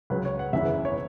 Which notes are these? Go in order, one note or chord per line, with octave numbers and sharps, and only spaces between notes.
C#2 C#3 F#3 B4
C#5
F#5
F#1 E2 C#3 E3 E5
B4
C#5